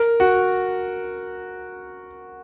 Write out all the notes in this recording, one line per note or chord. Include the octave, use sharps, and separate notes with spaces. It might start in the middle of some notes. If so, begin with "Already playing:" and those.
Already playing: A#4
F#4